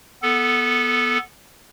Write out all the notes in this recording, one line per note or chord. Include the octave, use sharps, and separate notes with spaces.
B3 A4